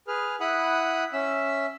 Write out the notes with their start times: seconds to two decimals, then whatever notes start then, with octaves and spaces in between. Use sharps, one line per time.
0.08 G#4 B4 F6
0.40 E4 F#5 B5 D#6 F#6
1.13 C#4 E5 E6